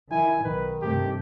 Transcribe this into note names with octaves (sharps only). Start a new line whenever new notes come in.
D#3 E4 G#5
B1 D#3 B4
G2 C3 A3 G4